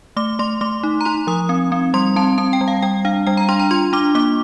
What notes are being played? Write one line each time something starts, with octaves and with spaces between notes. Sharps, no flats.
A3 D6
A3 C6
A3 D6
D#4
A#5
D#4 C6
F3 D#6
C4
C4
G3 C6
C4 A5
C4 A5
G5
G3
F5
G3 G5
D4 F5
G3 G5
A#5
D4 C6
A#5
F4 C6
D4 D6
A#3 D6